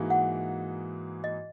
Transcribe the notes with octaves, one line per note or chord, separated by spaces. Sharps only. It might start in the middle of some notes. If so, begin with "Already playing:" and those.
Already playing: G#2 E3 A#3 D#4 F#4
F#5
D#5